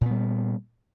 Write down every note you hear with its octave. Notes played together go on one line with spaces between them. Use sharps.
A#2 G3 B3